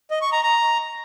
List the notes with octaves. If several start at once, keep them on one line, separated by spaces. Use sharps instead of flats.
D#5
C#6
A#5
A#5